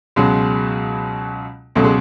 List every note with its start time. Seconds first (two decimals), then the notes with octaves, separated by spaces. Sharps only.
0.16 C#2 B2 F#3 G#3
1.75 C#2 B2 F#3 A3
1.84 G#3